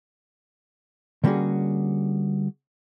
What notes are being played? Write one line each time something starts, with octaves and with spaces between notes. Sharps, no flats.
D3 G3 A#3 C#4 F#4 G#4